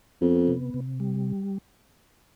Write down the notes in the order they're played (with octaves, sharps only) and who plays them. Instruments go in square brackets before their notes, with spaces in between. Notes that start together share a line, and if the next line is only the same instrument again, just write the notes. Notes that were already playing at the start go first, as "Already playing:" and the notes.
[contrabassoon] F2 [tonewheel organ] B3
[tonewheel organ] C3
C3
G3